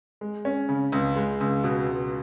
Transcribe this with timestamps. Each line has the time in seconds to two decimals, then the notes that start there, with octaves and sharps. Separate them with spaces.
0.21 G#3
0.45 C#4
0.69 C#3
0.92 C#2
1.16 G#3
1.41 C#2
1.64 B2
1.88 C#2